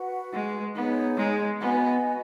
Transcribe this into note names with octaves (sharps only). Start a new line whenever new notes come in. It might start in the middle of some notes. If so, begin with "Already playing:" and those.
Already playing: F#4 B4 F#5
G#3
B3 D#4 G#4 C#5
G#3
B3 F#4 D#5 G#5